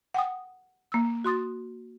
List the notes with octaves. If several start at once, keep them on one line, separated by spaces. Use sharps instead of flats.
F#5 G5 D#6
A#3 E6
F#4 C6 D#6 A6